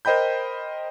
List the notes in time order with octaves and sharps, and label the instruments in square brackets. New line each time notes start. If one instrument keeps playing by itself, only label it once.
[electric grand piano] A#4 C5 D#5 G5 B5 G6